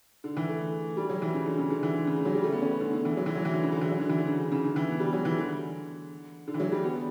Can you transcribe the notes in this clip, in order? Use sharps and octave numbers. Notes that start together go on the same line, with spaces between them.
D3
E3
A3
G3
F#3
E3
C#3
D3
C#3
D3
E3
D3
C#3
D3
F#3
G3
A3
B3
C#4
B3
D3
D3
E3
F#3
E3
F#3
E3
D3
C#3
D3
E3
F#3
D3
E3
D3
C#3
C#3
D3
E3
B3
G3
F#3
E3
D3
D3
E3
F#3
G3
B3